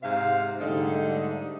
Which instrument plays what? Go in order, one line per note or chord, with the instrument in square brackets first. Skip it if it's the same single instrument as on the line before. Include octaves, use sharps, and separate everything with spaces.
[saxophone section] G#2 C3 F5
G#2 D3 G3 A3 D#4